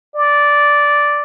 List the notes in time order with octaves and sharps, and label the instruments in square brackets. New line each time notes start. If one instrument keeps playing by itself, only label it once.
[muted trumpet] D5